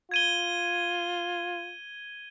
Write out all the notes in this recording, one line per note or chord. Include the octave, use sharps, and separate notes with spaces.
F4 G#6 D#7 G7